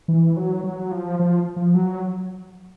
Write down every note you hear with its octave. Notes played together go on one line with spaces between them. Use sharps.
E3
F#3
F#3
F3
F3
F3
F#3